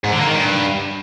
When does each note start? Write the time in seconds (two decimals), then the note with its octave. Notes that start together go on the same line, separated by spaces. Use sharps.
0.04 G#2
0.12 D3
0.20 A#3
0.27 D#3
0.35 G2